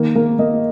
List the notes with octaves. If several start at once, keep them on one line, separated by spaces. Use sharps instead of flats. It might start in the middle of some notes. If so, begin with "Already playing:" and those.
Already playing: D#3 A#3
A#3
A#3 D#5